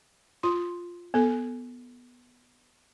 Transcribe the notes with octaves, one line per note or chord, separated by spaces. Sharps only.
F4 C6
B3 A4